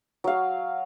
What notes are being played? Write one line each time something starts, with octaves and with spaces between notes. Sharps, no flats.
F#3 F5